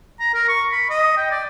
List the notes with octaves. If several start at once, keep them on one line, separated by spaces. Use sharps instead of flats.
A#5
A#4
C#6
B5
D#5
G5
D5